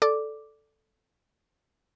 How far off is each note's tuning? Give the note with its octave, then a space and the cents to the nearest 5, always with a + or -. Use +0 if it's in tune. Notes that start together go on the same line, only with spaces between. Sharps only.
A4 +0 D5 +0 D6 +0